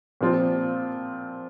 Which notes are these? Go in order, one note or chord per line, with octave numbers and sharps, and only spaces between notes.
A#2 F3 C4 F4